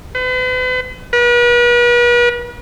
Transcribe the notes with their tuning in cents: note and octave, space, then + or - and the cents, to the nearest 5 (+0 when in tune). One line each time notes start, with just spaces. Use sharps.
B4 +45
B4 -40